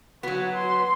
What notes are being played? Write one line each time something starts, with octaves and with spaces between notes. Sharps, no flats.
F#3 B3 F#4
C6